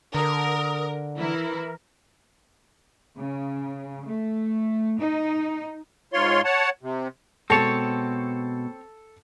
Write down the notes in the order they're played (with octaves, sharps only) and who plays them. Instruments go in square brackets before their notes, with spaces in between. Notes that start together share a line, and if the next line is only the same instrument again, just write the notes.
[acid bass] D3 [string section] A#4 [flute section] D#6
[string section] E3 E4 [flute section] A#4
[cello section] C#3
A3
D#4
[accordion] G#2 F4 C#5 C6
C#5 F#5 A5
C3
[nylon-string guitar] B2 G#3 [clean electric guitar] C4 C#5 [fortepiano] A4 A5